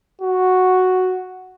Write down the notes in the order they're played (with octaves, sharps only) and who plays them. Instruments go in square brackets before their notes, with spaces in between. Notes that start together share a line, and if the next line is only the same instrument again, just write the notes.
[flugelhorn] F#4